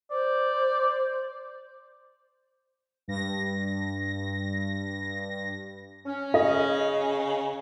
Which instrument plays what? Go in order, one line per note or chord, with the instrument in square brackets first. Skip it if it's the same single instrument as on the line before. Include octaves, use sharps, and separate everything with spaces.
[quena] C5 [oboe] D5
[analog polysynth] G2 A#6
[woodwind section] C#4
[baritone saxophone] C#3 [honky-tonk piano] D#5